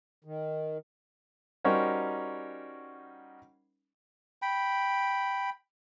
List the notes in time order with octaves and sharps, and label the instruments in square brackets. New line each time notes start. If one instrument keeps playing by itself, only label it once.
[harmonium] D#3
[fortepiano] G3 C#4 D#4 F#4 A#4 C5
[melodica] G5 B5